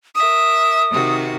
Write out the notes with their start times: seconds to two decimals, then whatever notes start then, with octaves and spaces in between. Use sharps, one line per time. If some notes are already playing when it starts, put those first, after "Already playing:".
0.15 A#4 E5 D#6
0.91 C3 D#3 F#4